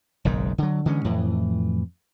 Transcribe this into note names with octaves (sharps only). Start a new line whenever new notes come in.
F#1 B1 G#2 D#3
D3 F#3
D3 E3 G#3 C#4
F2 A2 E3